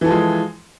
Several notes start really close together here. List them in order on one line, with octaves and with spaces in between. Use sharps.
E3 A4 F3 G#3